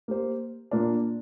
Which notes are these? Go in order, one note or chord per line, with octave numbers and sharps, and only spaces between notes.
A#3 G4 C5
A#2 A#3 D4 F4